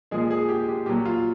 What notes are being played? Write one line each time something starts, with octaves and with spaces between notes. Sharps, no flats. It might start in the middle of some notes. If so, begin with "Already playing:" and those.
A#2 F3 G#3 G#4
G#4
G4
G4
A#2 F#3 G4
F4